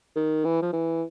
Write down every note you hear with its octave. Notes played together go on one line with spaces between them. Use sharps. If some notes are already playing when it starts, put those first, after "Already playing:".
D#3
E3
F3
E3